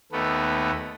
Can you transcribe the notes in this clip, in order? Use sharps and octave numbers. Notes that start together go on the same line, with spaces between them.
D#2 A3 B3